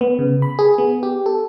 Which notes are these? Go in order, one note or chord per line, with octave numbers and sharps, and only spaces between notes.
B3
C#3
B5
G#4
B3
G4
A4